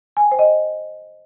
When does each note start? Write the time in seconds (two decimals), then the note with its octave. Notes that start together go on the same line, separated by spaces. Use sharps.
0.17 G#5
0.24 G5
0.32 C5
0.39 D#5